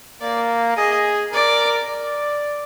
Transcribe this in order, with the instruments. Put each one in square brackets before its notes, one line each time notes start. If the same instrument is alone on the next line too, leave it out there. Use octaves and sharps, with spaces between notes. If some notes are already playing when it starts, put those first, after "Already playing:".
[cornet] A#3 [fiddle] D5
[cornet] G#4 [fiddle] D#5
[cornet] A#4 [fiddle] D5
[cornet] D5